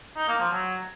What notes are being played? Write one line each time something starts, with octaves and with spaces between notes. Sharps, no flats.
D#4
A#3
F3
F#3